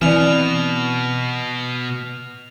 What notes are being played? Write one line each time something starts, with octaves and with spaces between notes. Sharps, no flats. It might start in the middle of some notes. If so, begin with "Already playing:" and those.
B2 E3 C4 D5 F6 F7